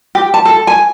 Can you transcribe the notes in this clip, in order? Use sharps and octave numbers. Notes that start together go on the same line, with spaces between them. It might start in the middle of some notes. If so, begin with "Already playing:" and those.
G4
A5
A4
G#5